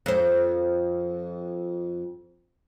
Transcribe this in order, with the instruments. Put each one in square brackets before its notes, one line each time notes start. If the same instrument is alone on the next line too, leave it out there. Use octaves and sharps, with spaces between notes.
[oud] F2 C5